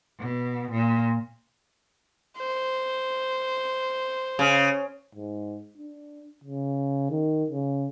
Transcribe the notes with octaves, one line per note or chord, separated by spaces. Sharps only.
B2
A#2
C5
C#3
G#2
D4
C#3
D#3
C#3